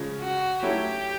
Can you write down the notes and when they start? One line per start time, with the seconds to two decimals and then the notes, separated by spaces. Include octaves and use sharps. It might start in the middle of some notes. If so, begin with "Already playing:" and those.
Already playing: C#3 F3 G#3
0.21 F#4
0.63 F#3 A3 C#4 E4 G4